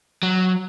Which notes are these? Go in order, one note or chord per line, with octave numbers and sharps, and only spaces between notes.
F#3